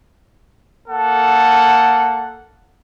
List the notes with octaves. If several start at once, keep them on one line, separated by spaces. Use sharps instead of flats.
A#3 A4 F#5